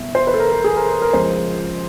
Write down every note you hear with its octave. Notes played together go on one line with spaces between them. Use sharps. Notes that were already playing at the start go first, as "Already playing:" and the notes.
Already playing: E2 B2 G3 E5
C5
B4
A4
A#4
A4
G#4
A#4
A#4
C#2 C#3 F3 G#3 C5